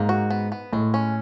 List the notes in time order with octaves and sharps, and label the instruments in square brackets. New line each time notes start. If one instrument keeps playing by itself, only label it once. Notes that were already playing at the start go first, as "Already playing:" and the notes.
Already playing: [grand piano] G#2 [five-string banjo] A#3
[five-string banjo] F#4
B3
B3
[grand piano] A2 [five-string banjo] G#3
[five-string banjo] C#4